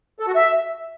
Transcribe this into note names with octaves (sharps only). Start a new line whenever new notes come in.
A4
F#4
E5